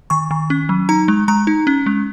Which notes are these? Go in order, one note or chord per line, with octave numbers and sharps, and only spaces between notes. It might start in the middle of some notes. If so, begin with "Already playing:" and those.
D#3 C#6
D#3
C#4
F#3
D#4 A#5
G#3
G#3 A#5
D#4
C#4
G#3